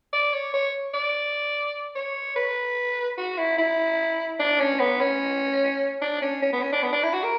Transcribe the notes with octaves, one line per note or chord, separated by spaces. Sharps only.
D5
C#5
C#5
D5
C#5
B4
F#4
E4
E4
D4
C#4
B3
C#4
D4
C#4
C#4
B3
C#4
D4
B3
D4
E4
F#4
A#4